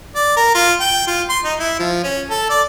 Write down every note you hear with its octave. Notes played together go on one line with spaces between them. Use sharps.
D5
A#4
F4
G5
F4
C6
D#4
E4
F3
C#4
A4
D5